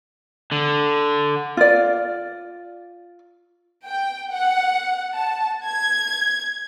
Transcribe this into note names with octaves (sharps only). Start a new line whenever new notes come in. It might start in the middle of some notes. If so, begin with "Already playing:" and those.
D3
F4 D5
G5
F#5
A5
G#6